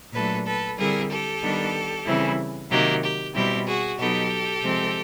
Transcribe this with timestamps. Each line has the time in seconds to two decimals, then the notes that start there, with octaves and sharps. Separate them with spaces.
0.13 A#2 F#3 A3 D4 A4 B4
0.45 A4 B4
0.77 D3 G3 C4 E4 G#4 A#4
1.10 G4 A4
1.42 D#3 G3 B3 D4
2.06 C#3 E3 G3 C4 E4
2.70 C3 D#3 F#3 A#3 G4
3.02 G4
3.34 B2 G3 C4 E4 G4
3.66 F#4 G#4
3.98 B2 F#3 B3 D#4 G4 A4
4.63 C3 F3 G#3 C4